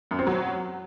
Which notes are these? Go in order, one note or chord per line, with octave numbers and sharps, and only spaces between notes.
F#2
C4
F#3